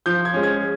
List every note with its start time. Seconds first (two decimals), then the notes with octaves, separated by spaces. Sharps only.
0.06 F3 G6
0.25 G#6
0.34 G#3 C#4
0.43 G#6